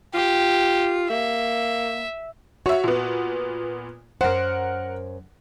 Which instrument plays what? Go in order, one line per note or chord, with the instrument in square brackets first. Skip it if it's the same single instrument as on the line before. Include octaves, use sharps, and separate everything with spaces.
[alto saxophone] F4 [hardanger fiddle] G4
[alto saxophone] A#3 [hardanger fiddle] E5
[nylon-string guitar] F#4 [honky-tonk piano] C#5 E5
[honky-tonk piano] A#2 B3
[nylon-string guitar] F#2 C5 [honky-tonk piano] A#4 F#5